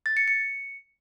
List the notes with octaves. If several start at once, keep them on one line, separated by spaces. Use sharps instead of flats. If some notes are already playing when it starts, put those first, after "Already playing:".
A6
C#7
C#7